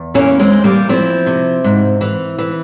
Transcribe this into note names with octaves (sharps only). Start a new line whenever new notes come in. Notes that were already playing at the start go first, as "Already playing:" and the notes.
Already playing: E2
E3 A#3 C#4
G#3 C4
E3
G3 A#3
F3 C4 E4
C3
G#2
E3
E3